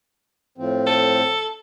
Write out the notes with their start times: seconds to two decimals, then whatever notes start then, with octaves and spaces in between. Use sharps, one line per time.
0.58 A2 F3 C4
0.87 A4